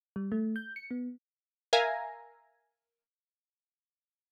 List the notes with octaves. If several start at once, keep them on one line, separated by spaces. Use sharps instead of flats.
G3
A3
G6
C#7
B3
A#4 E5 F5 G#5 A#5